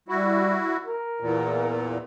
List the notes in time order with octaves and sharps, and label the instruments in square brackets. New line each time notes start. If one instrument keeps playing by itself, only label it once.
[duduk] G3 [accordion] E4 F#4
[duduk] A#4
[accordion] E2 A#2